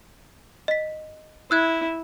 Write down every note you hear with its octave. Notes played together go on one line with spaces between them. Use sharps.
D#5 B6
E4 E6 F#6 G#6